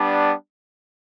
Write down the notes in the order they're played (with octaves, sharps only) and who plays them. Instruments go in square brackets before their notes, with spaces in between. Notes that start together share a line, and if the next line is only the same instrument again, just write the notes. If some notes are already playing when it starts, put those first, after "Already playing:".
Already playing: [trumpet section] G3 B3 D4